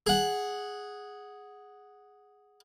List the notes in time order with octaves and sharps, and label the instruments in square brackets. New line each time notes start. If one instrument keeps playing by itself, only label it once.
[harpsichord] G#4 F#5